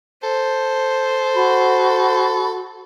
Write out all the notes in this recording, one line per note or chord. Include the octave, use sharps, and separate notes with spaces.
A4 C5
F#4 B5